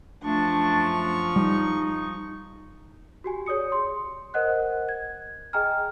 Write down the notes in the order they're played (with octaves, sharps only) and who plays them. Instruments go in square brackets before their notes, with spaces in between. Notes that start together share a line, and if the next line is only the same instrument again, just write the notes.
[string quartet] F#2 F3 C#6 [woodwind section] A3 D4
[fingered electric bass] G3 [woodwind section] D#4
[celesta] F#4 G4 G#5
G#4 C#5 D5 D#6 C#7
C6
A#4 C5 D#5 F#5 F#6
G#6
G#4 D#5 G5 G#5 A#5 F6